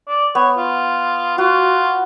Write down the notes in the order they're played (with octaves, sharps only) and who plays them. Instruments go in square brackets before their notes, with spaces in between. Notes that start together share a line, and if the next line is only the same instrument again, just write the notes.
[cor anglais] D5
[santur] B3 [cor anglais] C#5
[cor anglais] F4
[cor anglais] F4 [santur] F#4